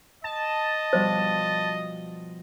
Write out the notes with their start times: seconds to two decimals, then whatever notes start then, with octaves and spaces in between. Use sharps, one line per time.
0.24 D#5 A5
0.93 B2 F3 G3 C5